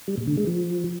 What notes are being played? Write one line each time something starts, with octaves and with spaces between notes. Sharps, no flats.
G3
A#2
D3
G#3
F3